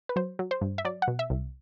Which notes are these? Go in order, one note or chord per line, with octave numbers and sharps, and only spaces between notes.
B4
F#3 C5
F#3
C5
G2
E5
F#3 D5
F#5
B2
E5
C2